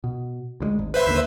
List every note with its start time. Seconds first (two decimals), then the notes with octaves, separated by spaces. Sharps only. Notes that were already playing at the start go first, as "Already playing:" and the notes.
0.04 B2
0.60 D2 F3 G#3
0.79 G#1
0.94 B4 C5 E5
1.07 D#2 D3 A#3